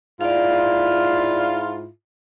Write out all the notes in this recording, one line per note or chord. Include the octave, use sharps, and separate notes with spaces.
G#2 E4 F4 D5 F5